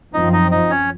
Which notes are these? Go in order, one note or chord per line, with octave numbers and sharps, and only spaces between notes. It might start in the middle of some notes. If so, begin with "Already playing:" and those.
F#2 F3 C4 D#4 D#5
D#4 D#5
D#4 D#5
C#4 C#5